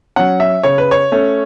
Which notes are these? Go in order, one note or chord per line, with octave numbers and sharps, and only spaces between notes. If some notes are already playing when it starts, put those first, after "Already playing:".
F#3 C#4 F#5
E5
C#3 C#5
B4
C#5
A3 C#4